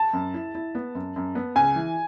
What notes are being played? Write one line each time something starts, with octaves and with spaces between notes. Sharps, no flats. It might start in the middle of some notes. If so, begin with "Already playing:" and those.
Already playing: A5
F#2
E4
E4
B3
F#2
F#2
B3
C#2 G#5
E3